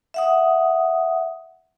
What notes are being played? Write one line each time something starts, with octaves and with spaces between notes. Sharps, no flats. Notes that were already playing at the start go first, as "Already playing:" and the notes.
E5 F#5 D#6